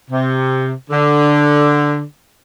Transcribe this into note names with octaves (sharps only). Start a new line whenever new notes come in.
C3
D3